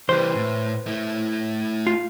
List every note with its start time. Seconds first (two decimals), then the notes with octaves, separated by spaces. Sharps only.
0.09 E3 G3 B4 C5
0.35 A2
0.86 A3 E4
1.87 F4